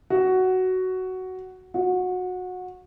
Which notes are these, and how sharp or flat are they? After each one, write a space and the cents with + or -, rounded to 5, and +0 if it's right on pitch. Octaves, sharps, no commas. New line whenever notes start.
F#4 +10
F#4 -20